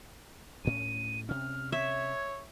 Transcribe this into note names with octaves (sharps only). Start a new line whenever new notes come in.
D2 A2 C#4 D#7
C3 C#4 F6
C#5 E5 G#6